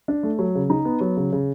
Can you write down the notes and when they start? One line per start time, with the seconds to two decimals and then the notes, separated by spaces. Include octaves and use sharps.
0.08 D4
0.23 A3
0.39 F#3
0.55 C#3
0.70 D#4
0.85 B3
1.01 F#3
1.17 C#3
1.33 C#3